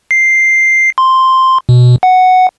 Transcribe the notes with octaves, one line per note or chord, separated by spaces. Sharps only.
C7
C6
B2
F#5